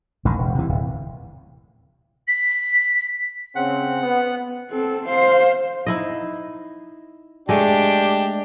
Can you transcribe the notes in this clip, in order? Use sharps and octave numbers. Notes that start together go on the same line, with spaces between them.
A1 G2 D#3
E1
C3 E3
D1
B6
C#3 C4 F#5
B3
C4 A4
C5 F5
D#4 E4 D#5
G#3 A3 D4 G4